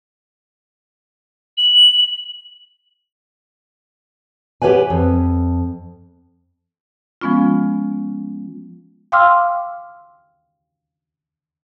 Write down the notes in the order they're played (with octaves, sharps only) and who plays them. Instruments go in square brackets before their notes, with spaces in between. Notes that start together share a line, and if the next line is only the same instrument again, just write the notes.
[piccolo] F#7
[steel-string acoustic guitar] G4 B4 C#5 F#5 G#5
F2
[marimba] F3 G#3 B3 C#4 F4
F5 G5 C6 D6 E6 F6